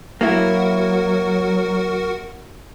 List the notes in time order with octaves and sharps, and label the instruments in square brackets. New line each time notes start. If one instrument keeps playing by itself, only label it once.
[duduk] F#3 [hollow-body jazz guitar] A#3 E4 [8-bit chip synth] F#4 A#4 F#5